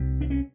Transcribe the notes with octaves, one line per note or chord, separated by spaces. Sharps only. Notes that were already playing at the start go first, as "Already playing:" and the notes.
Already playing: C2 C3
D4
C#4